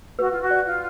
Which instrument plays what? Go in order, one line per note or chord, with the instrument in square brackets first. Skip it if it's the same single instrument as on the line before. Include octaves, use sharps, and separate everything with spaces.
[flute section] F#4 [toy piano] B4
[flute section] F4
F#4
[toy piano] D5
[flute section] F4